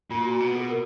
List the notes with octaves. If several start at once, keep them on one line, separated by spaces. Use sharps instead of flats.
A#2 F4
F#4
B2
G#4
A#4